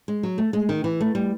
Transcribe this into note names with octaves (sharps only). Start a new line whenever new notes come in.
G#3
F#3
A3
G#3
D#3
E3
A3
G3